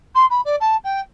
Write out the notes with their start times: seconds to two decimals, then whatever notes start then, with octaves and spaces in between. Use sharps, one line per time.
0.15 C6
0.30 B5
0.45 D5
0.60 A5
0.84 G5